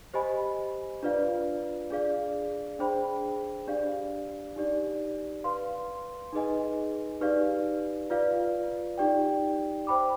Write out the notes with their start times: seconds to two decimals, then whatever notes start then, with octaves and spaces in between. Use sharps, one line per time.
0.14 G4 C5 D#5 G#5 B5
1.03 D4 F4 B4 D5 F5
1.91 D4 G#4 D5 F5
2.79 D4 G#4 C5 G5 B5
3.67 D4 G4 D5 F5
4.56 D#4 G4 D5
5.44 B4 F5 C6
6.33 D#4 G#4 B4 D#5 G#5
7.21 D#4 G4 B4 D5 F5
8.10 F4 B4 D5 F5
8.98 D#4 G4 D5 G5
9.87 C5 G5 B5 D6